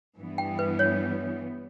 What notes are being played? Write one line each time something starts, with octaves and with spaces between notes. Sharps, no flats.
G2 E3 B3
G5
B4
C#5